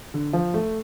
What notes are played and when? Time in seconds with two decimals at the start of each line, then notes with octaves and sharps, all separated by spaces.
0.14 D3
0.33 F3
0.54 A3